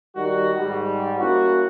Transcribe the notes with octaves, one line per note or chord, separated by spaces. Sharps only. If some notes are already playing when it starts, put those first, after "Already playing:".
D#3 G3 F#4
G#2 G3
A#3 C#4 E4 F#4